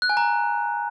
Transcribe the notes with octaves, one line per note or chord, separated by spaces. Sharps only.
F#6
G#5
A#5